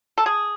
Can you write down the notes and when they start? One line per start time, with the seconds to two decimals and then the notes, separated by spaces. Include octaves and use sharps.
0.18 A4
0.26 G#4